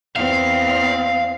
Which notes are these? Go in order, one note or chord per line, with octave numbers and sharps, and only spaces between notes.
E2 C4 F5